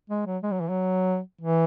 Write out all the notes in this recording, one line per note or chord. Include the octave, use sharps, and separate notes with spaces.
G#3
F#3
G#3
F#3
E3
F#3
E3